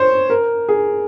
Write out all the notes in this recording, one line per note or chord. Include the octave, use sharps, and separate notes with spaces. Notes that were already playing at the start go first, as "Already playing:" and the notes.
Already playing: C5 C#5
A#4
G#4